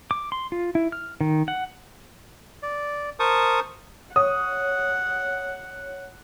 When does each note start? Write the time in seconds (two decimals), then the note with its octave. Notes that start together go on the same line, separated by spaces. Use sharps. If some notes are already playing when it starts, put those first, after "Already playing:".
0.11 D6
0.32 C6
0.52 F4
0.75 E4
0.92 F6
1.21 D#3
1.48 F#5
2.63 D5
3.20 A#4 C5 A5 C#6 D#6
4.16 C#5 F#5 D#6